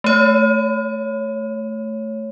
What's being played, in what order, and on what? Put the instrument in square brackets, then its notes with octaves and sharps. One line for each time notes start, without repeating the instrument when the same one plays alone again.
[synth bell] A3 C#5